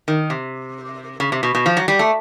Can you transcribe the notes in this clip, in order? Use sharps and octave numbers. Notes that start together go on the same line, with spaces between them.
D#3
C3
C#3
C3
B2
B2
F3
F#3
G3
A3